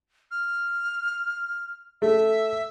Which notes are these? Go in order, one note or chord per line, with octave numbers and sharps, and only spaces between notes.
F6
A3 E5